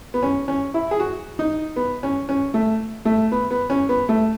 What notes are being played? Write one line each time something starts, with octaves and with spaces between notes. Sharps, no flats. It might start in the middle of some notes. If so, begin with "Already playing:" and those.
B3
C#4
C#4
E4
G#4
F#4
D#4
B3
C#4
C#4
A3
A3
B3
B3
C#4
B3
A3